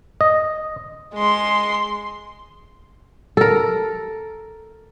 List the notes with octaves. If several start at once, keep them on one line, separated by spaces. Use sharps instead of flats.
D#5
G#3 C6
A4 A#4